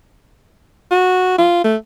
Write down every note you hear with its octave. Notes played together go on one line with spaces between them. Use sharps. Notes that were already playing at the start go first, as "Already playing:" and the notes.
F#4
F4
A3